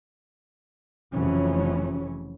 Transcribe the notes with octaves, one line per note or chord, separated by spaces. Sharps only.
F1 F2 C#3 E3 F#3 C#4